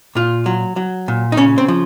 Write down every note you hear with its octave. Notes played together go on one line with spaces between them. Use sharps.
A#2 F4
F#3
F#3
A#2
D#4
C#3 C#4
C4
F3